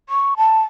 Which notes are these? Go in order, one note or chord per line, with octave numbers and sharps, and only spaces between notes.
C#6
A5